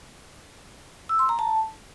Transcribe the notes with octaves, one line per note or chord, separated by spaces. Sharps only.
E6
C6
A#5
A5